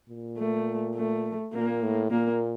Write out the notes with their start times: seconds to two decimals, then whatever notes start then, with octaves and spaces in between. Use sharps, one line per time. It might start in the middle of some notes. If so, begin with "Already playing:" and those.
0.09 A#2
0.38 A3
0.96 A3
1.54 A#2 A#3
1.83 A2
2.10 A#2 A#3